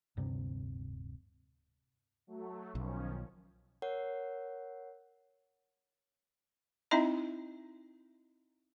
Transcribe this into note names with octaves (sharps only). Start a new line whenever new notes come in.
D1 G2 C3
F#3 A3
B1 D#3 F3 C#4
A#4 C#5 F#5
C4 D#4 E4 D#5 E5 A#5